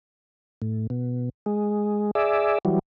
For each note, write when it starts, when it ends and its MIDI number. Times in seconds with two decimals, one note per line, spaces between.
0.62 0.87 45
0.90 1.29 47
1.46 2.11 56
2.15 2.58 68
2.15 2.58 74
2.15 2.58 76
2.65 2.79 52
2.65 2.79 54
2.65 2.79 55